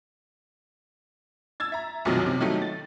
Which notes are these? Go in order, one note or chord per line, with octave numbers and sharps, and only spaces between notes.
E6 G#6 A6
E5 A#5
B1 F#2 C3 D#3 F3 F#3
C3
D#3 F#3 G3 A3 D#4 E4
A6